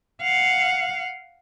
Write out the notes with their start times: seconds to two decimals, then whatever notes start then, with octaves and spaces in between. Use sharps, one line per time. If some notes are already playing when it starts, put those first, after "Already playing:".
0.22 F5 F#5